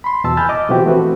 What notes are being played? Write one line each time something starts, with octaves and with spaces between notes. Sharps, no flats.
B5 C6
E2 B2 A5 E6
G#5 B5 E6 F6 G6 A6
D#5 D6
B2 E3 F3 C4 F#4 G4
E3 A3 C4 F#4 B4